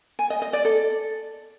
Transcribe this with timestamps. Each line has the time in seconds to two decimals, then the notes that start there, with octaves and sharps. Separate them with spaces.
0.19 G#5
0.30 D#5
0.42 D#5
0.53 D5
0.65 A4